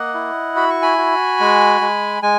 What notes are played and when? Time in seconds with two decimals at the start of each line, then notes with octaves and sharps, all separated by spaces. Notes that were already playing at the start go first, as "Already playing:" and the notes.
Already playing: A#3 D#5 F#5
0.14 E4
0.56 F#4 B5
0.70 C#6
0.82 G#5 B5
0.98 F#4
1.40 G#3
1.81 G#3
2.23 G#3 G#5